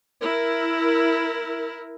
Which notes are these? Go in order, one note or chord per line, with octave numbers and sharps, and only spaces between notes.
E4 A#4